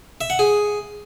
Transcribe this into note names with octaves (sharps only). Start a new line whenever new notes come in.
E5
F#5
G#4